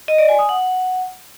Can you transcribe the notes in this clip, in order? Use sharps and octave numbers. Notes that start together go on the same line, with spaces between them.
D#5
D5
G#5
D#6
F#5